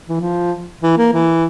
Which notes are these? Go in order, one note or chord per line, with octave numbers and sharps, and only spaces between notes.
E3
F3
E3
A#3
E3